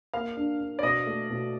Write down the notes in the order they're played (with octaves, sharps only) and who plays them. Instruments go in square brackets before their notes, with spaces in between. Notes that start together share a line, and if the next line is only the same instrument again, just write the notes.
[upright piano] A#3 [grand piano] F5
[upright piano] D4
D4
[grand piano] D5
[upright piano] B2 [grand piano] D#5
[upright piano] A3
B2